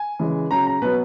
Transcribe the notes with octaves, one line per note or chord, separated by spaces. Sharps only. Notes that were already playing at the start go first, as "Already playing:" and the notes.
Already playing: G#5
C#3 E3 G#3
C#3 F#3 A#5
A#5
B2 F#3 B4